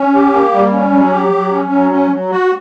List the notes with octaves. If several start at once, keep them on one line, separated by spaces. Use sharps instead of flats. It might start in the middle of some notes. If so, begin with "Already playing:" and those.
Already playing: C#4
G4
A#3
G3
C#4
F#3
G4
F#3
C#4
F#3
C#4
F#3
F#4